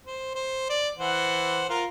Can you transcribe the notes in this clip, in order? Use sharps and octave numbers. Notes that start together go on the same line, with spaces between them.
C5
C5
D5
E3 C5 F#5
F4 A#4